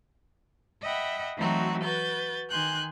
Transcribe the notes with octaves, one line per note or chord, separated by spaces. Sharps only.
D#5 E5 F#5 G5 B5
E3 F#3 A3 C4 D#4 F#4
F#4 B4 G6 A6
D#3 G#5 C6 F#6 G6